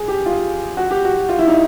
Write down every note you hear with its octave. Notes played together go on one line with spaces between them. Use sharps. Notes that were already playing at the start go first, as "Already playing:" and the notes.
Already playing: G#4
G4
F4
F#4
G4
F#4
F4
E4
D#4